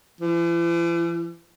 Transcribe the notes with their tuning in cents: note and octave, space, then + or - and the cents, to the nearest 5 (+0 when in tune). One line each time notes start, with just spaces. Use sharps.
E3 +45